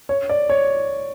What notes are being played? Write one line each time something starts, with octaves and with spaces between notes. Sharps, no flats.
C#5
D5
C#5